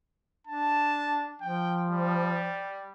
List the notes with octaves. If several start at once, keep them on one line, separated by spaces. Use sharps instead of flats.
D4 A5
F3 G5
G3